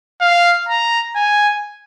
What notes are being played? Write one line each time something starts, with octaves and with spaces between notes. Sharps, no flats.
F5
A#5
G#5